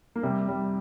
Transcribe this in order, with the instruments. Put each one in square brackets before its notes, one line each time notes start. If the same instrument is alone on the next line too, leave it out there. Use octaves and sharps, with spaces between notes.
[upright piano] A#3
C3 G3
G3